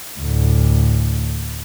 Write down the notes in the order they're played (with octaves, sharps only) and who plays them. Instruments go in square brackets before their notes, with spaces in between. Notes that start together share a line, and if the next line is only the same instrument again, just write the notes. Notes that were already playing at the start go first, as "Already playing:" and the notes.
[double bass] D2 A2